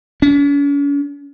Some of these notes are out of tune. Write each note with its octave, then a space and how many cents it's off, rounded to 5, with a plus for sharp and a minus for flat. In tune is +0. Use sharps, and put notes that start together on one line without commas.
C#4 +45